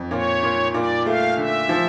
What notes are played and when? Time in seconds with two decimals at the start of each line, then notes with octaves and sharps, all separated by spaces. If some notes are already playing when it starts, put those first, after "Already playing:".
Already playing: F2
0.11 A#2 C#5
0.43 A#2
0.74 A#2 D5
1.06 A3 F5
1.37 D3 E5
1.69 F3